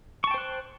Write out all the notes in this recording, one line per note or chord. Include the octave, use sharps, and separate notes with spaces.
C5 G5 A5 C#6 F#6